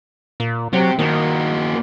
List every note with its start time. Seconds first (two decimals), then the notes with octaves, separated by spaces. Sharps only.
0.40 A#2
0.73 F#3 C4 G4
0.99 D#3 A#3 F#4